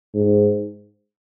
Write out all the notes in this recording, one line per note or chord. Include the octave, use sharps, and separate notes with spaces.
G#2